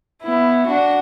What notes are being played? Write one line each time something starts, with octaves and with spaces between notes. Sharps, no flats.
B3 E4
D4 F#4